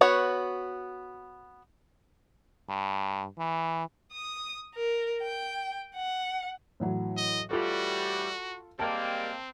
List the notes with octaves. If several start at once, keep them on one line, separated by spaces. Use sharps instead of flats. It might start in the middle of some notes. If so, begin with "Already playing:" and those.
B3 F#4 C#5
G2
E3
D#6
A#4
G5
F#5
A2 E3 F#3
D#5
A2 E3 G3 F4 F#4 A4
G3 G#3 A#3 C4 G5 A5